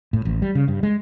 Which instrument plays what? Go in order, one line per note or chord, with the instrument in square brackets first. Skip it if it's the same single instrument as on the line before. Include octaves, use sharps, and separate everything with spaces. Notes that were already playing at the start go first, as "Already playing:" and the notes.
[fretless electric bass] A2
A1
G3
C#3
G2
G#3